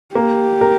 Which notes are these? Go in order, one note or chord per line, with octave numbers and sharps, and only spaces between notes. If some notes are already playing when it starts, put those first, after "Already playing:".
A#3 G4
A#4